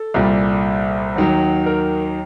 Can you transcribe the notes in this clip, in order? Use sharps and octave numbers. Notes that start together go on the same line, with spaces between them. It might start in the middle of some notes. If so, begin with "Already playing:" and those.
Already playing: A4
C2 A#2 G3
D#2 D#3 F#3
A#4